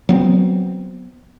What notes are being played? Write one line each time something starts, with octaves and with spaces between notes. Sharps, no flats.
F#3 B3 C4